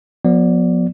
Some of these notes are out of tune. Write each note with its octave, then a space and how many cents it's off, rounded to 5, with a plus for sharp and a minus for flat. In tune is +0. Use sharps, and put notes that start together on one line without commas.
F3 +40 B3 -20 D5 +0